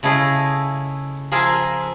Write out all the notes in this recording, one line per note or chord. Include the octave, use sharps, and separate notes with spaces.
C#3 A3 E4 G#4 D#5
F3 F4 G#4 A#4 E5